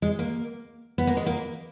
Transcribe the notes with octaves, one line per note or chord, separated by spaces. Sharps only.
G#3
A#3
B3
A#3
G#3
A#3